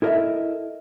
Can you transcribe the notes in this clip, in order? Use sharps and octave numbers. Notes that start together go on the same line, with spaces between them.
E4 A4 A#4 C#5 D#5 E5